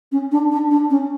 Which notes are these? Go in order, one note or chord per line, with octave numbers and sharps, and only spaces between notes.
C#4
D4
D4
D4
C#4